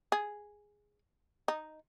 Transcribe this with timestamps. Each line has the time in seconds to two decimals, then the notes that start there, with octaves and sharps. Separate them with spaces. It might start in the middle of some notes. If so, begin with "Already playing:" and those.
0.12 G#4
1.48 D#4